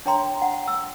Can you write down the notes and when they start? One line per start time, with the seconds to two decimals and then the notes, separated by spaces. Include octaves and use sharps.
0.06 D4 C#5 G5 A#5 C6
0.42 F#5
0.68 E6